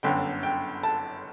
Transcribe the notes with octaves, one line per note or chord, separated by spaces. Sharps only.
G1 F#2 D3 G5
G5
A5